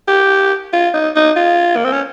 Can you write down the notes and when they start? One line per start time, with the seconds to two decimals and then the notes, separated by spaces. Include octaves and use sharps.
0.08 G4
0.73 F4
0.94 D#4
1.16 D#4
1.36 F4
1.76 A#3
1.84 C4
1.92 C#4